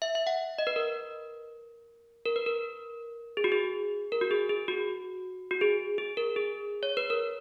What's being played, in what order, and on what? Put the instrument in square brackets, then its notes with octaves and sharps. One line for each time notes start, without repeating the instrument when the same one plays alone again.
[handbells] E5
E5
F#5
D#5
B4
A#4
A#4
B4
A#4
G#4
F#4
G#4
A#4
F#4
G#4
G#4
F#4
F#4
G#4
G#4
A#4
G#4
C#5
B4
A#4